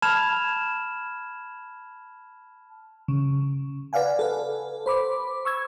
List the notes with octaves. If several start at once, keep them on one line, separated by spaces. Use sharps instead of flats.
A5 B5 F6 G#6 E7 F7
C#3
B4 D5 F5 F#5 G#5
A4 B4
C5 B5 D6
C#6 E6 G#6